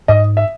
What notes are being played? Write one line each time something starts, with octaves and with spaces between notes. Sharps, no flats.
G#2 D#5
E5